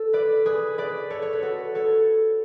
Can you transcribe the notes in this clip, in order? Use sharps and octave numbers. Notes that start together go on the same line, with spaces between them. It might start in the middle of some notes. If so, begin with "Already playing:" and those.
Already playing: A4
B4 D5
G#4 B4
B4 D5
A4 C#5
C#5
B4
F#4 A4
A4 C#5